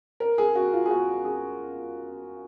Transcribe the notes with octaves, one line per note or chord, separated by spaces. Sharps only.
A#4
G#4
F#4
F4
G#4
F#4
G#4